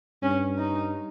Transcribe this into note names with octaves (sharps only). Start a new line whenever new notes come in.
G2 C#4
D#4